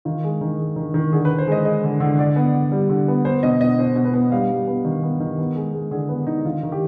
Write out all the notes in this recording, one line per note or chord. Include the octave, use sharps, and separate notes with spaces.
D#3 F4
G#3
D#3
G#3
D#3
D#3
D3 G#4
B4
D3
C5
G#3 D#5
G#3 D#5
D3
D3
D3 D5
B3
D3
G3
D3
B3
B3 C5
B2 D#5
B2 D#5
B2 C5
B2
B4
B3
G3 F5
G3
B3
D#3
B3
D#3
B3
G#3
G#3
D3 G#4
B3 B4
D3 D#4
D#3 F4
D#3
G4